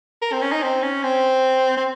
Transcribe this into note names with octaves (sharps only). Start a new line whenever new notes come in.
A#4
C4
C#4
D#4
C4
C#4
C4
C4